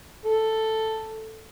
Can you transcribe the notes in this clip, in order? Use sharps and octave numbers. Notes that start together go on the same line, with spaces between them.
A4